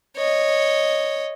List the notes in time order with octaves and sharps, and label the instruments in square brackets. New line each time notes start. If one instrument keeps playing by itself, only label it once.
[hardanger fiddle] C#5 D#5